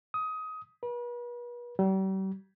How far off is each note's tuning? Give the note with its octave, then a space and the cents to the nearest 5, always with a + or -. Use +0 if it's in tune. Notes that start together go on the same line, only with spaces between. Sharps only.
D#6 +20
B4 -40
G3 -40